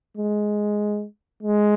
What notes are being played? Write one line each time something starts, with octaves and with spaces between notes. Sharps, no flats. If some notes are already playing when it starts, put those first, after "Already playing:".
G#3
G#3